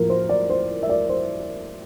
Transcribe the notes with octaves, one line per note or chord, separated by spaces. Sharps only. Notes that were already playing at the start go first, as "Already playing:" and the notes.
Already playing: A2 F3 A#3 A#4
C5
D5
C5
E5
D5
C5